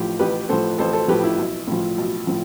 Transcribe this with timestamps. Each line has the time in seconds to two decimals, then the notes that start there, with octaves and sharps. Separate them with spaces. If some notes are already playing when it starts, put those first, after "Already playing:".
Already playing: A1 A2 F3 G4
0.19 A1 G4 B4
0.49 A2 F3 A4 C5
0.78 A1 A4 C5
0.93 A4 C5
1.08 A2 F3 G4 B4
1.24 E4
1.38 B1
1.67 A2 F3
1.98 B1
2.27 A2 F3